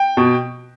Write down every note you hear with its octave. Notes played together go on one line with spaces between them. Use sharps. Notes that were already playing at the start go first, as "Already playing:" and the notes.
Already playing: G5
B2